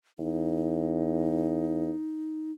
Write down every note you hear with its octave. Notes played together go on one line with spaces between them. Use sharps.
E2 D#4